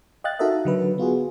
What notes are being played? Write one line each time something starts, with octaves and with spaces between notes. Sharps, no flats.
D#5 F5 G5 F#6 A6
D#4 F#4 A4 A#4 D#5 E5
D3 F#3 B4
B3 F4 F#4 G#4